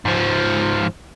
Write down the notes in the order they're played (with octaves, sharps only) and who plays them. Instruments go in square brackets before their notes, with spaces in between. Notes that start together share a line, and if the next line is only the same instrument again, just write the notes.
[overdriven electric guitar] G#2 F3